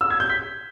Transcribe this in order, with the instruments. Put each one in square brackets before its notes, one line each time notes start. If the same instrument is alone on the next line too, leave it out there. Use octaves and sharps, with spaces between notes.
[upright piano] E6
G#6
G6
B6